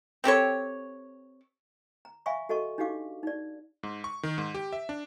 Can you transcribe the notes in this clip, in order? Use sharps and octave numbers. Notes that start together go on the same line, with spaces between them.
C4 G4 A4 C#5
A#5
E5 F5 G#5 B5 C#6
F#4 A4 D#5 A5 C#6
D4 D#4 F#4 G4 F5 D6
D#4 D5
G#2
C#6
D#3
G#2
G4
E5
D4